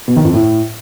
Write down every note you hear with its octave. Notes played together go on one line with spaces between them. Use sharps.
B2
D#3
F2
A2